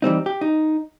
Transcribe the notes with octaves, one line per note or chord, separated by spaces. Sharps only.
E3 G3 C4 D#4
G4
D#4